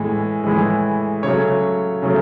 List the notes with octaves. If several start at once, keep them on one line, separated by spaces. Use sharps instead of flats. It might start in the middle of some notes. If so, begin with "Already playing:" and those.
Already playing: A2 E3 G#3
A2 E3 G#3
C#3 F#3 A3 C#5
C#3 F#3 A3